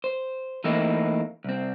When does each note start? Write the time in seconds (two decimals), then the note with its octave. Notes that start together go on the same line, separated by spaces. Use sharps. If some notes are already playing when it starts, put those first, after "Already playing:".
0.04 C5
0.64 E3 A3 A#3 C4 D#4 E4
1.44 C2 C4